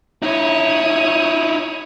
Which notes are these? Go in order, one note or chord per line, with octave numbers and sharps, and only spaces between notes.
D#4 E4 C#5 D#6